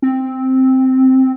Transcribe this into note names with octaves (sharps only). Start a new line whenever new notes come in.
C4